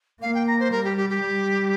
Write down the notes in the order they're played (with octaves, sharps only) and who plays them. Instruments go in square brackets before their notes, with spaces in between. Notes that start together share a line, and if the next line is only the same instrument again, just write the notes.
[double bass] A#3 [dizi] F5
[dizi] G5
A#5
C5
[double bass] G3 [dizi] A#4
[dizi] G4
G4
G4
[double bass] G3